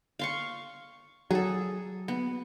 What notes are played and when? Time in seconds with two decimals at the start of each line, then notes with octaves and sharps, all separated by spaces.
0.19 F5 C6 C#6
1.31 F#3 G#4 A4
2.08 B3